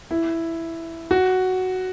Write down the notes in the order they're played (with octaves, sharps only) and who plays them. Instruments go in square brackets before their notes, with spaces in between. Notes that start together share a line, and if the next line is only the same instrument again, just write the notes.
[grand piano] E4
F#4